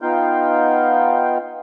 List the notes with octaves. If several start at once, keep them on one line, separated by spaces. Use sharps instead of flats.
B3 D#4 F4 F5 G5